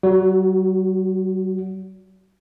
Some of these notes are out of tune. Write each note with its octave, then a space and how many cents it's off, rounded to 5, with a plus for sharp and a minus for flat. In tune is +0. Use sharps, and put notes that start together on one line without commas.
F#3 +45 F#4 +0